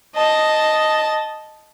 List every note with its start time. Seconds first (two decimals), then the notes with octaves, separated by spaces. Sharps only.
0.15 D#5 A5